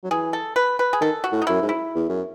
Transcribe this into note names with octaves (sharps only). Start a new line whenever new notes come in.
F#3
E3 G#4
A4
B4
B4
G#4
D#3 A4
F#4
A2
D#4
F#2 E4
G#2
E4
E2
F#2